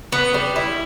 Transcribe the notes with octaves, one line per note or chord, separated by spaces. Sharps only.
B3
G3
E4